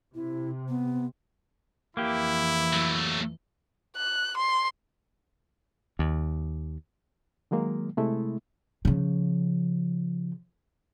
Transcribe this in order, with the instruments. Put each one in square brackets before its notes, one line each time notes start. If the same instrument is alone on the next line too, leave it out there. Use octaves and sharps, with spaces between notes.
[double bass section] C3 [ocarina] E4
[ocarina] B3
[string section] F2 E3 [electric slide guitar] A#3 G4 [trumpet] E4
[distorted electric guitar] F#3 A3
[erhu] F#6
C6
[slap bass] D#2
[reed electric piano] D#3 F#3 G#3 A#3
C3 G#3 A3 E4
[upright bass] C#3 F3